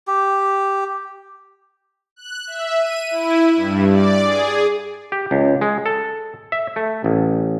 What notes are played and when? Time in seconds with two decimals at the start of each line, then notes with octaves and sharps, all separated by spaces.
0.08 G4
2.16 F#6
2.47 E5
2.79 D#7
3.11 E4
3.55 G2
3.91 D5
4.24 G#4
5.12 G4
5.31 C#2
5.61 G#3
5.86 A4
6.52 E5
6.76 A3
7.04 A1